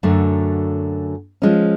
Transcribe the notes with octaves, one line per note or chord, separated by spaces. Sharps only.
F#2 D3 F#3 A3
F3 G#3 C#4